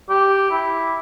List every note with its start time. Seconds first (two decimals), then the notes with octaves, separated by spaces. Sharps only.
0.10 G4
0.51 E4